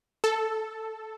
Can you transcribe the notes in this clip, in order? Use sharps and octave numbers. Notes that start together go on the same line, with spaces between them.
A4